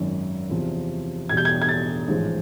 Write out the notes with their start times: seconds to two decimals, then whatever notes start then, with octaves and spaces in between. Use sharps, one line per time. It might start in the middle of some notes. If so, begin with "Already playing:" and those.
Already playing: G#1 F#2 D#3
0.50 E2 C3 F3
1.29 E2 B2 G3 G#6
1.37 G6
1.45 G#6
1.62 G#6
1.69 A6
2.08 A1 G#2 F3 G#3